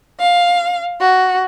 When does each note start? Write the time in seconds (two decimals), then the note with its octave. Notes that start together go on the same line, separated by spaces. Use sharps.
0.18 F5
1.00 F#4